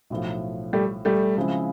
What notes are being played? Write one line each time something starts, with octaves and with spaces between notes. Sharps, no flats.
B1 A2 F3
G3 A3
G3 A3
C#3 F3 G#3 C4 E4